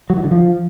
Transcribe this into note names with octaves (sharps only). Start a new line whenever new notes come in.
F#3
E3
D3
F3